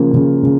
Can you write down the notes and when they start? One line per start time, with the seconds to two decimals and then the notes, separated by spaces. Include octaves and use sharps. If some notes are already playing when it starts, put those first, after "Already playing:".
Already playing: C#3 F3 A#3
0.14 C#3
0.43 C#3